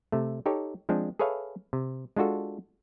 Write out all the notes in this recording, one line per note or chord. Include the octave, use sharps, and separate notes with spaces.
C3 A3
D#4 G4 A4 C#5
F3 G#3 C4 D4
G#4 A4 B4 C#5 E5 F5
C3
G#3 D4 F4 F#4 A4